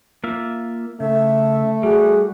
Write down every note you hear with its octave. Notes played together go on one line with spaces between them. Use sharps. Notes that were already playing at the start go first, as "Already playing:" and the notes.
A#3 F4 E5
C#3 A3 E5
G3 F#4 G#4